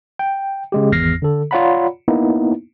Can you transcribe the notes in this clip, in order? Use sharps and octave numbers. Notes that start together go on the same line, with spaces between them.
G5
C#3 G#3 G4
G#1 E2 F6 A#6 C7
D3 A4
F4 C#5 D5 F#5 A#5 B5
A#3 B3 D#4 E4